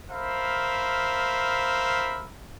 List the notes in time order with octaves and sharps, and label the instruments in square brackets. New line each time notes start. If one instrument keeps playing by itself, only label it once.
[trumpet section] A#4 C5 E5 F5 B5